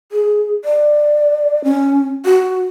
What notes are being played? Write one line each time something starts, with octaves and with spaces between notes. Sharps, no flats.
G#4
D5
C#4
F#4